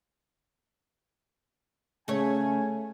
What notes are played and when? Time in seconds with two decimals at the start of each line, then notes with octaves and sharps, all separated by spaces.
2.08 C#3 A3 C#5 G#5